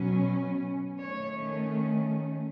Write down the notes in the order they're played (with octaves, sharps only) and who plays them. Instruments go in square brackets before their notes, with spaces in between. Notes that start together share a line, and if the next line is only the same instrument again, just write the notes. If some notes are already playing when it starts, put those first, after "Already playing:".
Already playing: [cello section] B2 F#3 C#4
D#3 A3 C#4 C#5